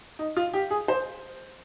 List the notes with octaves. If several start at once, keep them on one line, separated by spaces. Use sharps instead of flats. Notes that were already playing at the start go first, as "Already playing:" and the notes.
D#4
F4
G4
G#4
C5